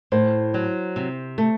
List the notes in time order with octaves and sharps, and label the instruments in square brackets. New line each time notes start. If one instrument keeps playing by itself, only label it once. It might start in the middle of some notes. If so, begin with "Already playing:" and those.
[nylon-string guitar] A2 [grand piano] C5
[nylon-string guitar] F#3
C3
A3